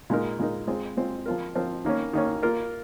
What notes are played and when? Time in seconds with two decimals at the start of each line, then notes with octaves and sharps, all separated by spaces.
0.10 A#2 G#3 D#4 A#4
0.39 A#2 G#3 D#4 A#4
0.67 G#3 C4 F4 G#4
0.97 G#3 C4 F4 G#4
1.26 F3 C4 F4 A#4
1.55 F3 C4 F4 A#4
1.84 D#3 A#3 C#4
2.13 D#3 A#3 C#4
2.42 A#3 F4 A#4